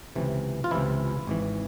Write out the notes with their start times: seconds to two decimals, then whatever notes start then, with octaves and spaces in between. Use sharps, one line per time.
0.15 C#2 C3 E3
0.64 F4
0.71 C#2 C3 E3 E4
1.27 G#1 G#2 E3